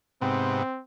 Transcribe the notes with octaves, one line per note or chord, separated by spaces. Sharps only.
G#2 C3 B3 C4